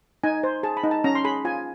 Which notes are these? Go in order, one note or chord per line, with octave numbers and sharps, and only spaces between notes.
D#4 G#5
C5
G#4 A5
B5
D#4
A5
C#4 A#5
C6
G#4 B5
F4 G#5